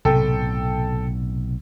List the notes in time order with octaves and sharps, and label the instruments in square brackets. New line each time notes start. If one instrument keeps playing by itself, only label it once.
[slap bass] B1 A2 [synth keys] C3 [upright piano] A4 G5